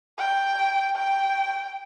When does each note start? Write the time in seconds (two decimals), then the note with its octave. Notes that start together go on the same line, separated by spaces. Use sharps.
0.18 G5
0.96 G5